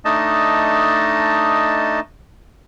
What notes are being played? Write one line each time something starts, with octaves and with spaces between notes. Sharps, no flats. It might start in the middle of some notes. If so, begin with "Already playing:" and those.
A3 D4 D#4 D#5 A5